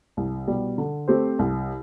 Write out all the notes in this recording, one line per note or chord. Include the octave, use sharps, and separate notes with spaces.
C2
B2 G3
D3
A3 C4 G4 C5
C2